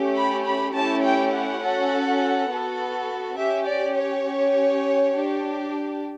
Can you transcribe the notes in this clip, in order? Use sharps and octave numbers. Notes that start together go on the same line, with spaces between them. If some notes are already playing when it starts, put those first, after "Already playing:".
Already playing: A3 C#4 G4
B5
B5
A3 C#4 E4 G4 A5
G5
F#5
C#4 F#4 A4
B3 F#4 A4
C#4 G4 E5
D5
C#5
C#4 G4
D4 G4